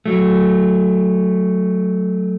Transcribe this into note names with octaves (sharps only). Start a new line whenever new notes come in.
F#3 A3